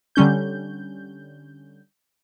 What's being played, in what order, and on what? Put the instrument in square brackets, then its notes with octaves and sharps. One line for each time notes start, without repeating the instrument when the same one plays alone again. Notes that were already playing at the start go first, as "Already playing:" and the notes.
[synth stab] D3 G3 C#4 G6